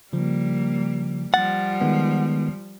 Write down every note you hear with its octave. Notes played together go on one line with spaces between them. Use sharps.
C#3 F3 G3 A#3
F3 G3 F#5 A6
D#3 G#3 B3